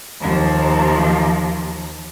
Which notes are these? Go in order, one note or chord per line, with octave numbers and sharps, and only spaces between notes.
D#2 F3